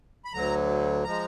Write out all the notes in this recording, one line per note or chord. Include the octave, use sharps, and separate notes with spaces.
B5
D2 D3 F#3 A#5
F3 G#3 A#5